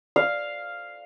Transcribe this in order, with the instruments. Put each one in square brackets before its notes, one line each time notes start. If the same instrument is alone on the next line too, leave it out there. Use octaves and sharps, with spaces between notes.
[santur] F5